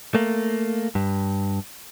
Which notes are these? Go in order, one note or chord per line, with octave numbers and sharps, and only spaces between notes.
A3 A#3
G2